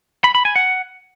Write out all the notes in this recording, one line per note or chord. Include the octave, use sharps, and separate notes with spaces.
B5
B5
G#5
F#5